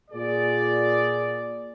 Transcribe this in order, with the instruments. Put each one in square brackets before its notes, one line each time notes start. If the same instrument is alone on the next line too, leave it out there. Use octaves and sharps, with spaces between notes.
[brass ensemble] A#2 G#4 D5